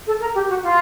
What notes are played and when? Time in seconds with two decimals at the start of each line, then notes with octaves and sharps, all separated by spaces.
0.06 A4
0.20 A#4
0.35 G4
0.49 F#4
0.63 F4